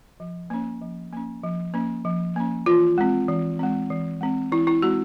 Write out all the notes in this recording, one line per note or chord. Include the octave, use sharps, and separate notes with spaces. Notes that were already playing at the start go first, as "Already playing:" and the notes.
F3
A#3 C#4
F3
A#3 C#4
F3
A#3 C#4
F3
A#3 C#4
E3 F4
G#3 C4
E3
G#3 C4
E3
G#3 C4
E3 E4
E4
G#3 C4 F#4